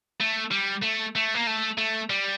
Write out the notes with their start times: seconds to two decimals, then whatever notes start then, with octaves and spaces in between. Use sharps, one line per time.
0.20 A3
0.51 G3
0.83 A3
1.16 A3
1.35 A#3
1.47 A3
1.78 A3
2.10 G3